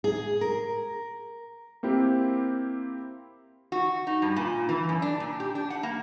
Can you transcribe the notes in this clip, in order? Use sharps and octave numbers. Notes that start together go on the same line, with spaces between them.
G#4
A#4
A#3 C4 E4 G4
F#4
D#4
G2
A#2
E3
F#2
D4
A#2
G4
D4
F#5
A#3